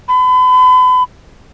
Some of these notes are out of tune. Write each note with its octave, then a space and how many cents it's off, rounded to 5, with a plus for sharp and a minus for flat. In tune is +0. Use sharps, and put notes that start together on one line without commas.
B5 +40